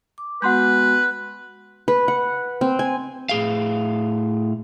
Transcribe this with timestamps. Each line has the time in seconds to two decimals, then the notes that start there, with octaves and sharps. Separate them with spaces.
0.18 D6
0.42 G#3 B3 F#4 B4 F#5 C6 G6
1.88 B4
2.08 F#5
2.61 C4
2.79 G#5
3.29 A2 G#4 F5